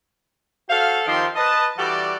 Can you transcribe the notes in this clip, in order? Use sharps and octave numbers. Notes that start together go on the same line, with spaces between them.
F#4 A4 C5 F5
D#3 F3 C4 D#4 G4 C6
B4 D#5 A5
E3 G3 F#4 G4 A4 D5